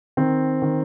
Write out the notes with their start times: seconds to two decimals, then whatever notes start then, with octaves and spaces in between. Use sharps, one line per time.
0.17 D#3 C4
0.62 D#3